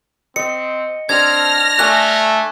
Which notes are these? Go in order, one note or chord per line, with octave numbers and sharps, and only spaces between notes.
C4 D#5 C#7
C4 D4 C5 A5 F6 G#6 A#6
A3 D5 G#5 F#6